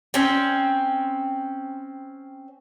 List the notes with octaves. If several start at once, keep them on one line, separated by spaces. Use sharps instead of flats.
C4 C#4